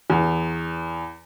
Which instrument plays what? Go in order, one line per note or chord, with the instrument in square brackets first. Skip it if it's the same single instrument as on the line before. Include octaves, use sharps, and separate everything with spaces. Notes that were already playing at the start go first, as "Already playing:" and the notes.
[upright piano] E2